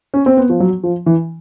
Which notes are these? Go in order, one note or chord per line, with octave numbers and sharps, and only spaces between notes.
C#4
C4
B3
F3
F#3
F3
E3